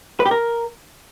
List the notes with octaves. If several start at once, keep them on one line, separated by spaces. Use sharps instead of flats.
B4
G4
A#4